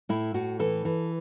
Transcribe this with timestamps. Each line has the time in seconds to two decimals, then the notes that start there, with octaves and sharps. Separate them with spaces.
0.09 A2 E4
0.34 A2 F#4
0.59 E3 A4
0.85 E3